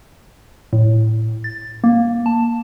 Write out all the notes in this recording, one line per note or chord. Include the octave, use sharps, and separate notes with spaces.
A2
A6
A#3
A5